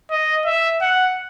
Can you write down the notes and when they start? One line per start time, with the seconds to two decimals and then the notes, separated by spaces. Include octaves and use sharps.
0.10 D#5
0.45 E5
0.81 F#5